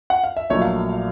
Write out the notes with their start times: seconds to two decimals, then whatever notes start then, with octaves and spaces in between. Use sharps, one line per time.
0.10 F#5
0.24 F5
0.37 E5
0.50 A#1 A#2 F#3 A3 C#5 D#5
0.62 F5